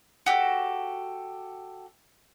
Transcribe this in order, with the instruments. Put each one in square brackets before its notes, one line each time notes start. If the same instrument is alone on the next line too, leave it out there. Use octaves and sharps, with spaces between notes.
[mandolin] F#4 G4 A4